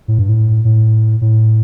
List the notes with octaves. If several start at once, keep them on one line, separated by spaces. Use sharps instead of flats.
A2
G2
A2
A2
A2